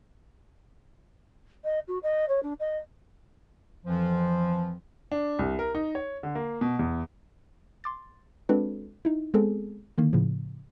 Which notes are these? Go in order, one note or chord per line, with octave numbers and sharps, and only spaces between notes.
D#5
F#4
D#5
C#5
D4
D#5
F2 E3 F3
D4
C2
A#4
D#4
C#5
D3
A#3
B2
E2
C6 D6 A6
G#3 C4 D4 F#4 A4 B4
D#4 E4
G#3 B3 C4 G#4 A4
D3 D#3 A#3
A2 C#3 F3